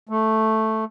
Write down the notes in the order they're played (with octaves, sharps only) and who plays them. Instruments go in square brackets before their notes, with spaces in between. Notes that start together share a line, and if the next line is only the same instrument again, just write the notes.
[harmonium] A3